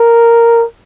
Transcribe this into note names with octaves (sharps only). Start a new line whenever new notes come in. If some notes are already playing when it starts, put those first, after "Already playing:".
Already playing: A#4